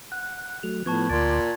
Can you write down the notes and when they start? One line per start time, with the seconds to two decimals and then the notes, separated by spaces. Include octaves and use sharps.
0.12 F#5 F#6
0.63 F#3 A3 F7
0.86 A2 F3 B3 A5 C#6 G#6
1.10 D2 A#2 C6 D6 G#6 A6